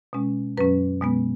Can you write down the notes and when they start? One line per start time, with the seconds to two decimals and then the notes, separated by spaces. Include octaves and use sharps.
0.13 B2 G#3 C#4
0.57 F#2 F#3 C#4 B4
1.01 B2 G#3 B3